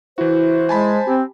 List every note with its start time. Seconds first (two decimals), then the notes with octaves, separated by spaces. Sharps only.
0.18 E3 E4 F#4 C5
0.69 G#3 G#5 A5 B5
1.07 C4 G4